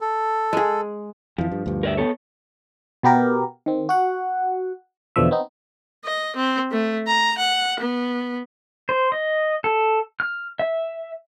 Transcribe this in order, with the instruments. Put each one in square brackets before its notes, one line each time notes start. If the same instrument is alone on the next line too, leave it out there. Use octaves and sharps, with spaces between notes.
[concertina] A4
[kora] G#3 G#4
[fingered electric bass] F2 E3 [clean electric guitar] F3
[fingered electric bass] G2
D2 G2
[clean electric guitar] A#4 D5 E5
B3 A4 C#5
[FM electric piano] B2 B3 G4 A#4
D#3 C4
F#4 F#5
E2 B2 D3 F3 E5
B3 C4 D#4
[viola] D#5
C4
A3
A#5
F#5
B3
[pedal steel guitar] C5
D#5
A4
F6
E5